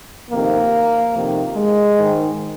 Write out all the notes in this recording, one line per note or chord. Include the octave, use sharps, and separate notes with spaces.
F2 C3 D#3 A#3
F2 C3 D#3
G#3
G#2 D#3